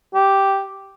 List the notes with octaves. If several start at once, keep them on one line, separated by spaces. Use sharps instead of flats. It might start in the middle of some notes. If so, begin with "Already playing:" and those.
G4